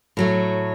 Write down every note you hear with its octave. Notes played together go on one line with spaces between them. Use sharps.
A2 F#3 A3